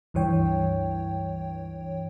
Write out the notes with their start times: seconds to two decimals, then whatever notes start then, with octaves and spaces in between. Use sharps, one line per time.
0.14 C#2 G2 E3 C#5 G5